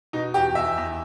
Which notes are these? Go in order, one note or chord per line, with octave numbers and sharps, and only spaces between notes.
B2 D#4
E2 G4
E2 E5
E2